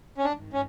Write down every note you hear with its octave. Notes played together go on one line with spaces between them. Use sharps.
C#4
G#1 G2 D#3 D4
C#4